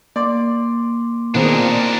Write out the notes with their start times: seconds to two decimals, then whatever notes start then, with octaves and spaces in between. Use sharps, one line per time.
0.16 A#3 D5 C6 D6
1.34 A#2 D#3 B3 C4 D4 G#4 A#4